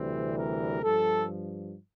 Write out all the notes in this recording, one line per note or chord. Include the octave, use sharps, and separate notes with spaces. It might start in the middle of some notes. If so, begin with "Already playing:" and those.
Already playing: D2 C3 E3 G3 C4
A#4
G2 F3 A4